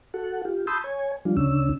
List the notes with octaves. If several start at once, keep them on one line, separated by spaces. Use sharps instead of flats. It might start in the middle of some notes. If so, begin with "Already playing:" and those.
F#4 A4 F#5
F4 G4
A5 B5 C6 D#6 E6 G6
C#5 G#5
F3 G3 D4 F4
D2 C#3 C#4 D4 E6